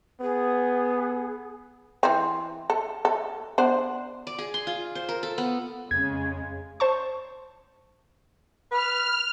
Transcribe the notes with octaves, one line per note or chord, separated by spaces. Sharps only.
B3 G#4
E3 C4
A4
A4
B3 D4 C5
D5
G#4
C6
F4
C5
A#4
A4
B3
F2 C#3 G#3 G#6
C5 A5 C#6
B4 F6